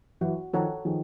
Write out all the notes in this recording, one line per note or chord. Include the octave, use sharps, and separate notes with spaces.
E3 F#3 F#4
D#3 F3 A4 C#5 F#5 A#5
D#3 F3 G#4